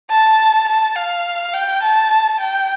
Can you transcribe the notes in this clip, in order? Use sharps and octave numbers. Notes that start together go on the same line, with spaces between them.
A5
A5
F5
G5
A5
G5